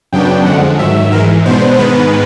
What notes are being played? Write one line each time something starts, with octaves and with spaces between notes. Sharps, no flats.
F#2 C#3 F#3 B3 D4 G5
F2 D3 F3 G#3 F#5
G#2 D#3 F#3 E5
G#2 E3 G#3 A#4
B2 G#3 B3 D4 C5
G#2 D#3 G#3 B3 B4